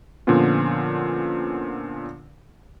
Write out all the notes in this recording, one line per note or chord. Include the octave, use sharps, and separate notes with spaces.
A#2 D3 F3 B3 C#4 F4